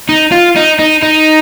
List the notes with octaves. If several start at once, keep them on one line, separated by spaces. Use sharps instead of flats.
D#4
F4
D#4
D#4
D#4